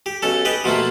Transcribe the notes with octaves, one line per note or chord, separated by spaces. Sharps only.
G4
B1 C#4 A4
G4 B4 D#5
B2 F3 A3 A#3